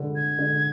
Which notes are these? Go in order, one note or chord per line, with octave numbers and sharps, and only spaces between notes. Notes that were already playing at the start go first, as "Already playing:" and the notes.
Already playing: D3
G#6
D3